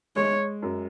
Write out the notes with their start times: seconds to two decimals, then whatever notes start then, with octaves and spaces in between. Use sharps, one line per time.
0.16 G#3 C#5
0.62 F#2